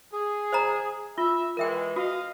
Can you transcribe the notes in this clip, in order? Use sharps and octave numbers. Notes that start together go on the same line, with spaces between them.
G#4
C5 D#5 A#5
F4 E5
E3 G#3 A#4 E5 G5
F#4 D#5 F5